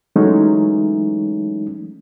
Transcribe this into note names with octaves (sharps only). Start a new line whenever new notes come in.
E3 F#3 G#3 A3 C#4 D#4